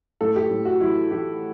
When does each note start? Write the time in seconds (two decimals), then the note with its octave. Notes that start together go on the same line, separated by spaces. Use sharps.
0.21 A2 A4
0.36 G4
0.50 A2
0.65 F#4
0.80 E3 E4
1.11 E3 G4